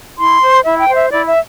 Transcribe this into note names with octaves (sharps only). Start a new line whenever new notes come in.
E4 C6
C5
E4 E5
G5
C5
E5
E4 D5
E5